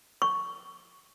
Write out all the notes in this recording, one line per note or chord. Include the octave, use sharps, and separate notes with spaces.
C#6